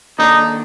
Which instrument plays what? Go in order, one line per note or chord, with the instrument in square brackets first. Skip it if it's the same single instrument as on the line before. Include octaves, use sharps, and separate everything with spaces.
[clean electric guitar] D#3 A#3 D4 A4 D5 [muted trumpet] D#4